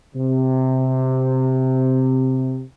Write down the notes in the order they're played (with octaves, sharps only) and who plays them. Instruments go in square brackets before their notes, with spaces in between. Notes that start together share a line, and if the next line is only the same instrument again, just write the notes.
[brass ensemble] C3